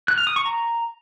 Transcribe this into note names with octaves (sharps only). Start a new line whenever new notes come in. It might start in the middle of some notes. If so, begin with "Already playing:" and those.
F#6
F6
D#6
C#6
A#5